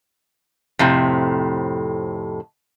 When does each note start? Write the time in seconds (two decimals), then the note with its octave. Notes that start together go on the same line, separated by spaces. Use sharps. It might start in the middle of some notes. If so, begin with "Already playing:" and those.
0.79 F2 A2 C3